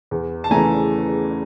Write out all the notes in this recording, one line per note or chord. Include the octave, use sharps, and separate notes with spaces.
E2
A5
C#3 E3 A3 G#5 A#5